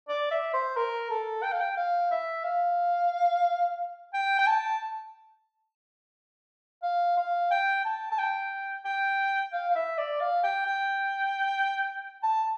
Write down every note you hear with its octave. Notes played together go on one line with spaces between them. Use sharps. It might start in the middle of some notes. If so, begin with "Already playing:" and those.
D5
E5
C5
A#4
A4
G5
F5
G5
F5
E5
F5
G5
G5
A5
F5
F5
G5
A5
A5
G5
G5
F5
F5
E5
D5
F5
G5
G5
A5